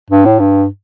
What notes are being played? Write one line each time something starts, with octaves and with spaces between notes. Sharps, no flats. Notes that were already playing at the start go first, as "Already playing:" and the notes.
G2
A2
G2